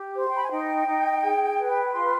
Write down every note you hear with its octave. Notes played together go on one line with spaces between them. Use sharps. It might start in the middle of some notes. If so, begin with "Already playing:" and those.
Already playing: G4
C5
G5
B5
G#5
D#4 G5
D#4
G#4
B4
F4 C6